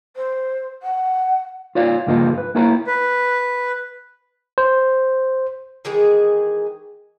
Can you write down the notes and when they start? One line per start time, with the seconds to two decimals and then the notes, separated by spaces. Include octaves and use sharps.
0.17 C5
0.83 F#5
1.75 F4 C#5 D5 F5
2.07 C#2 G2 F3 A#3 F4 D#5
2.38 B4
2.55 A#3 E4 A#4 C#5 A5 A#5
2.87 B4
4.58 C5
5.85 D#3 E3 G#3 G#4